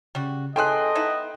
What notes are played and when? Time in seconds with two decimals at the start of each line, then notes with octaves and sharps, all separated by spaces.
0.15 C#3 G3 F#4
0.56 C#3 E3 G#4 A4 D#5 G5 C6 F#6
0.95 B3 D#4 E4